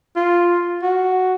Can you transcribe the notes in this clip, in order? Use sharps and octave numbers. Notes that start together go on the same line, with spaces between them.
F4
F#4